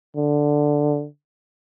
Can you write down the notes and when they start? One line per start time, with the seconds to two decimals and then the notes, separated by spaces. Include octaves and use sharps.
0.16 D3